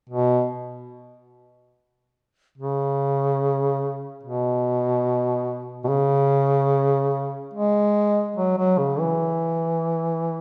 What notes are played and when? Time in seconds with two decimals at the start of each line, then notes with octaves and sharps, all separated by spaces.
0.09 B2
2.58 C#3
4.23 B2
5.84 B2
5.88 C#3
7.54 G#3
8.36 F#3
8.57 F#3
8.78 C#3
8.99 E3